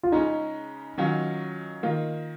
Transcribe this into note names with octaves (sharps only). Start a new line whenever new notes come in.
F4
C#3 G#3 C#4 D#4
D#3 F#3 C#4 F4
D#3 A#3 F4